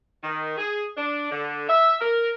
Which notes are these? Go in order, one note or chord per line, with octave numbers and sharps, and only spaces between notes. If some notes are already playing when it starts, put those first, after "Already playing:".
D#3
G#4
D4
D3
E5
A#4